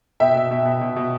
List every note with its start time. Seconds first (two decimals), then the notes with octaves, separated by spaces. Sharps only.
0.20 B2 E5 G5
0.35 B2
0.51 B2
0.66 B2
0.81 B2
0.96 B2